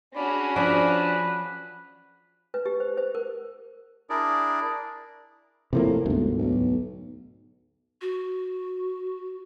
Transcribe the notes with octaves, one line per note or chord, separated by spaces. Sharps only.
C#4 D4 F#4 G#4 B5
F3 D4 B4
B4
G4
C5
C5
A#4
D4 E4 G#4 A#4 D5
A2 C3 F3 A#3
G1 D2 G#2
B1
F#4